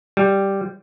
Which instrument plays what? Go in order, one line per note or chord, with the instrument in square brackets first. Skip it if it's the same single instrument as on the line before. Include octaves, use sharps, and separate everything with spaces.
[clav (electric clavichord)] G3